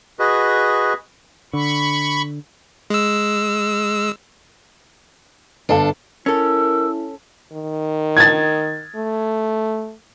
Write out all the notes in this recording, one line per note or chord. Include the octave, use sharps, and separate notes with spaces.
F#4 G#4 B4 D#5
D3 B5 C#6
G#3 E6
G1 D4 A4 F5 A5
C#4 E4 A4 A#4 E6
D#3
G#6 A6
A3